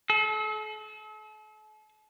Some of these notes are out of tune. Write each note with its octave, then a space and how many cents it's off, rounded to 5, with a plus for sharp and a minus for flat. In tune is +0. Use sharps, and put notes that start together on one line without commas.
A4 -40